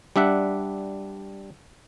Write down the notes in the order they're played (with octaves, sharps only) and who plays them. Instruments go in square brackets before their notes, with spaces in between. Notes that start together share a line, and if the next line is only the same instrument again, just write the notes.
[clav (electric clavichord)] G3 D4 E5 F#5